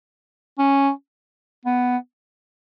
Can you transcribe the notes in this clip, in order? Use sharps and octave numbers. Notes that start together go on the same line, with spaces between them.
C#4
B3